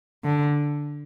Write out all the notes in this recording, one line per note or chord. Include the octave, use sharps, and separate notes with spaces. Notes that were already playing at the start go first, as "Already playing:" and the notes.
D3